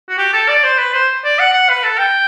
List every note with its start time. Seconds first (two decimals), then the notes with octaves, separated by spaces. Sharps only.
0.09 F#4
0.18 G4
0.33 A4
0.49 D5
0.64 C5
0.78 B4
0.94 C5
1.24 D5
1.39 F#5
1.53 F#5
1.69 B4
1.83 A4
1.98 G5